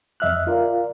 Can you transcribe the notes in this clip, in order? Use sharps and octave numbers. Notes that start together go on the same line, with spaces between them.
F2 D#5 E5 F6 F#6
F4 A#4 D5 F5